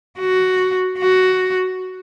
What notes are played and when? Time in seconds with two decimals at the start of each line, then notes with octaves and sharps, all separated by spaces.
0.19 F#4
0.98 F#4